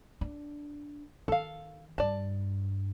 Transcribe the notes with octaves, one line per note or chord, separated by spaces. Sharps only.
D4
D#3 A4 F5
G2 D5 A5